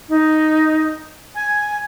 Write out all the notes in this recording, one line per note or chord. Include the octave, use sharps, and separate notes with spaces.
D#4
G#5